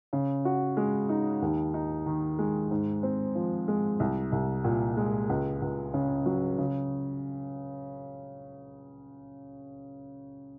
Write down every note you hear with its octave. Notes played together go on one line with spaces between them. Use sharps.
C#3
F#4
G#3
D#4
D#2
D#4
D#3
G#3
G#2
C4
F3
G#3
C2
C2
A#2
G#3
C#2
C#2
C#3
F#3
C#3